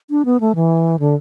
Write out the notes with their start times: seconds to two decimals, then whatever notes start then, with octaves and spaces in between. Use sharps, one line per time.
0.10 D4
0.25 B3
0.40 A3
0.55 E3
0.99 D3